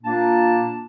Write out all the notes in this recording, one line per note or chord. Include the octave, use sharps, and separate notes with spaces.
A#2 A#3 D4 A5